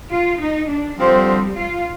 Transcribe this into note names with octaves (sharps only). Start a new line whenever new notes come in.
F4
D#4
D4
D3 F3 G3 C4
F4